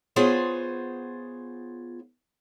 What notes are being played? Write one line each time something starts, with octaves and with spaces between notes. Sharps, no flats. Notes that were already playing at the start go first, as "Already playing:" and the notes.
B3 F4 G#4 C5 C#5